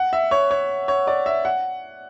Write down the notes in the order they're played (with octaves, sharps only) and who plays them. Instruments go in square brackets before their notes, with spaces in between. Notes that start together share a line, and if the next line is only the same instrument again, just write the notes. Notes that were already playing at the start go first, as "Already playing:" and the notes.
Already playing: [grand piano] F#5
E5
C#5
C#5
C#5
D5
E5
F#5